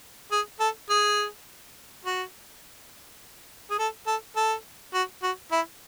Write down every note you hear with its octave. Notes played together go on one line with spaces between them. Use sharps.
G#4
A4
G#4
F#4
G#4
A4
A4
A4
F#4
F#4
E4